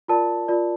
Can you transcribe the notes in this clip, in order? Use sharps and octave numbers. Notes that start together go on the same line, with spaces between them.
F4 A#4 D5 A5
F4 A#4 D5